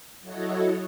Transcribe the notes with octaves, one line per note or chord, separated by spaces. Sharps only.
F#3 E4 F#4 A4 C#5 D#5